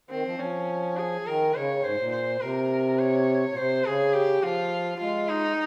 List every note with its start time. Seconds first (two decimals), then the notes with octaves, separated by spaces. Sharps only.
0.10 D#3 C4
0.25 F3
0.39 F3 C#4
0.97 G#4
1.26 D#3 A#4
1.55 C#3 C#5
1.83 G#2 C5
1.98 A#2
2.12 C5
2.41 C3 A#4
2.99 C#5
3.51 A#2
3.56 C3 C5
3.85 C#3 G#4
4.14 G4
4.42 F3 F4
5.00 G#3 F4
5.29 D#4